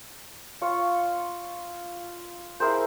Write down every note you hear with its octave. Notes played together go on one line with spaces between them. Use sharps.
F4 C#5
E4 G#4 A#4 C5